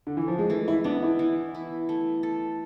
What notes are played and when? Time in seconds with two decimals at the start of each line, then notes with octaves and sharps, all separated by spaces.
0.07 D3
0.17 E3
0.28 F3
0.39 G#3
0.50 E3 A3
0.68 E4
0.84 B3 D4
1.03 E4
1.19 E3
1.55 E4
1.89 A3
2.23 A4